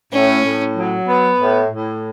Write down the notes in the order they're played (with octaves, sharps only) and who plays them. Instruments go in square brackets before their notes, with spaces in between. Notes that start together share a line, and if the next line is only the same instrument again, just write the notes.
[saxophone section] A2 [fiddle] C#4
[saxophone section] A2
F#3
B3
A2
A2